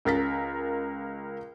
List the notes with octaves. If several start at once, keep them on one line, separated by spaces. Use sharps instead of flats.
C#2 A#4 A6 B6